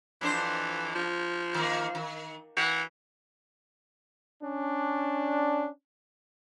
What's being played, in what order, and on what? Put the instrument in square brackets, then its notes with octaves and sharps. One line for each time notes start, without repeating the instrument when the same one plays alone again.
[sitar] F2 D4 C5 [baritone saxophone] E3
[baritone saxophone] F3
[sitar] D#3 A#3
D#3
[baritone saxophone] E3 [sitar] F#4
[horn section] C#4 D4